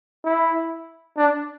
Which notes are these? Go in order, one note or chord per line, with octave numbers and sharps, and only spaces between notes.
E4
D4